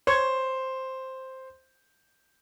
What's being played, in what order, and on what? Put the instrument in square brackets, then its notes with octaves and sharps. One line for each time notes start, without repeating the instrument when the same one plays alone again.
[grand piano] C5 [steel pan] C#5